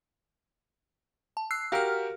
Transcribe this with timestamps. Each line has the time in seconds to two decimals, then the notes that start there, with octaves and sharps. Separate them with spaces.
1.37 A5
1.51 E6 F#6 C7
1.72 F#4 G4 A#4 F5 F6